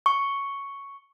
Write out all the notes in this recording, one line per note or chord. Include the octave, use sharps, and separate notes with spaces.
C#6